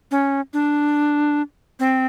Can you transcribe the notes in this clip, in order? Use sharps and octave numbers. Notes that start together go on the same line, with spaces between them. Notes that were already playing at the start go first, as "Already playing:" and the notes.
C#4
D4
C4